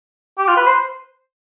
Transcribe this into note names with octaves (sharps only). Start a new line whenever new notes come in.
G4
F4
B4
C5